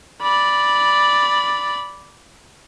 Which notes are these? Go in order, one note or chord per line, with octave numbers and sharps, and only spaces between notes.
D5 B5